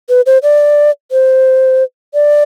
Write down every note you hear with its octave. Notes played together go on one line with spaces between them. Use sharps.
B4
C5
D5
C5
D5